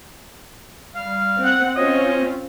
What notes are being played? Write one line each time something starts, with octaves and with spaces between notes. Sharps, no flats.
G3 F5 F6
C4 F#5
C4 C#4 F4 C5 C#5 D#5